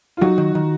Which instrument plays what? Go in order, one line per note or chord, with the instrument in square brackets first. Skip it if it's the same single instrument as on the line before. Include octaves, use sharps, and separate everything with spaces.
[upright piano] F4
[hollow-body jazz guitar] F#3 [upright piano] D#4 F#4
[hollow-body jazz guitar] D#3
D#3